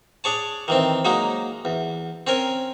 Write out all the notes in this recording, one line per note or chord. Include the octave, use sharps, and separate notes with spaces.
D4 G#4 C#5 A5
D#3 E3 C4
F#3 G#3 A#3 D#4
E2
C4 C#4 A#4 G#5